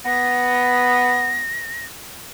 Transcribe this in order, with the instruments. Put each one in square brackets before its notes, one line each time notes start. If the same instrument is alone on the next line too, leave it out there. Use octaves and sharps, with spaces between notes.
[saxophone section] B3 [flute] A#6